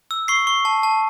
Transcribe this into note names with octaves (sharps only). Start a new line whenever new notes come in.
E6
C#6 C7
C#6
A5
A5